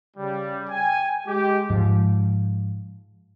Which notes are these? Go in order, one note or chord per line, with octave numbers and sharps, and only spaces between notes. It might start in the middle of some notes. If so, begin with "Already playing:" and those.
C#3 G3
G5 G#5
G#3 G4
G#2 F3